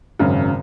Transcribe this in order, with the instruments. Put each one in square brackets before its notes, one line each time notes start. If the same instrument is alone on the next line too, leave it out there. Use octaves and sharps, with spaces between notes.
[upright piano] G#1 F#2 C#3